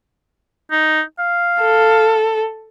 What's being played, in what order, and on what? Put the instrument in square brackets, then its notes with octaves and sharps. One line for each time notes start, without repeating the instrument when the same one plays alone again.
[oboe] D#4
F5
[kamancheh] A4